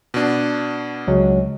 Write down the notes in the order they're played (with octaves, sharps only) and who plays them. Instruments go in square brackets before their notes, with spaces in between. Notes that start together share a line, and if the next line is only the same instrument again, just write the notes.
[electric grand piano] B2 D4
[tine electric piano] C#2 F#3 G#3